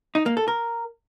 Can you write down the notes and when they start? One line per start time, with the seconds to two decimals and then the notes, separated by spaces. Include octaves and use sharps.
0.15 D#4
0.26 A#3
0.37 A4
0.48 A#4